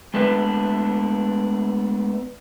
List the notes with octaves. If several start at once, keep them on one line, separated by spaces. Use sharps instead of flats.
G#3 A3 B3 D4 B4 E5